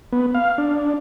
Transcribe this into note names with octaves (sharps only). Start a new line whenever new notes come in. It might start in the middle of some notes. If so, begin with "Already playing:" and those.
B3
F5
D4